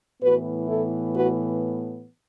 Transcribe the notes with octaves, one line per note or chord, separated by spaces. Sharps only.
A2 E3 B3 F#4 B4
E4 A4
F#4 B4